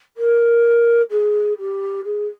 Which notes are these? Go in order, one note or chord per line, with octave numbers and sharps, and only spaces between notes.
A#4
G#4
G4
G#4